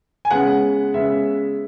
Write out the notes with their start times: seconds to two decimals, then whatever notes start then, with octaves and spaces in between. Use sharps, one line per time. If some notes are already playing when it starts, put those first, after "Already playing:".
0.25 G#5
0.31 C#3 G#3 B3 F#5
0.94 C#3 G#3 B3 E5